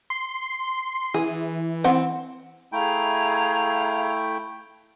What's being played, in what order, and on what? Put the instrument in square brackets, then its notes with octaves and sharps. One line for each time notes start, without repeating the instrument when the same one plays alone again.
[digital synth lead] C6
[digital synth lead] E3 [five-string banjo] G#4
[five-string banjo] C4 F#5
[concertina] A3 E4 G5 [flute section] G#4 F5 A#5